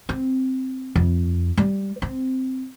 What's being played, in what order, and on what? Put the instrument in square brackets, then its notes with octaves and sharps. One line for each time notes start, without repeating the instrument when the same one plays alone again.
[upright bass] C4
F2
G3
C4